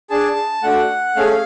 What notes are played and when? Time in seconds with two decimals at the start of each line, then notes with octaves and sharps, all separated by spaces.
0.10 D4 G#4 A5
0.63 A3 D4 F#4 F#5
1.16 A3 C#4 G#4 F5